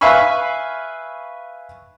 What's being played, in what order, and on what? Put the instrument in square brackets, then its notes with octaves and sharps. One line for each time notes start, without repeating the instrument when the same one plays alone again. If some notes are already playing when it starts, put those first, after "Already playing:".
[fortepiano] B4 E5 F5 G#5 B5 C#6